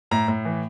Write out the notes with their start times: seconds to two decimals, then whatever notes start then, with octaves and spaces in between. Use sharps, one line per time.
0.11 A2 A#5
0.28 A2
0.45 E3